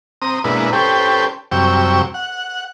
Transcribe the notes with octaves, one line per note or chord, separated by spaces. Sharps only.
C4 A#5 D#6
B2 G#3 A#3 D4 E4 B4
C#4 G4 A4 B4 C5 G5
F#2 C3 G3 G5 C#6 E6
F#5